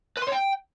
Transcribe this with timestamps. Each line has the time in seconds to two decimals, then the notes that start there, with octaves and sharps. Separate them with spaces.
0.17 B4
0.22 C6
0.27 C#5
0.32 G5